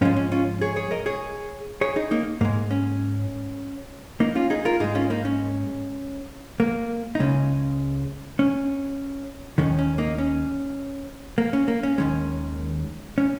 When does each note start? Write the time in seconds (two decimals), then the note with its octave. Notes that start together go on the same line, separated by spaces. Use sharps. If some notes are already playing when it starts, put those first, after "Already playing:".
0.01 G#2 F3 G#3 C#4 F4
0.16 C#4
0.32 C#4 F4
0.61 G#4 C#5
0.76 G#4 C#5
0.91 A#4 D#5
1.06 G#4 C#5
1.81 G#4 C#5
1.96 D#4 G#4
2.11 A#3 D#4
2.41 G#2 G#3 A#3
2.71 C#4
4.20 A#3 D#4
4.35 C#4 F4
4.50 D#4 G#4
4.65 F4 A#4
4.80 G#2 G#3 D#4 G#4
4.95 C#4 F4
5.10 A#3 D#4
5.25 C#4
6.60 A#3
7.15 D#4
7.19 C#2 C#3 G#3 C#4
8.39 C#4
9.58 D#2 D#3 G#3 C#4
9.79 C#4
9.98 A#3 D#4
10.18 C#4
11.38 A#3
11.53 C#4
11.68 A#3
11.83 C#4
11.98 D#2 D#3 G#3 C#4
13.18 C#4